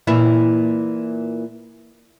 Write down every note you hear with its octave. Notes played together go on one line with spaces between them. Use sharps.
A#2 E3 E4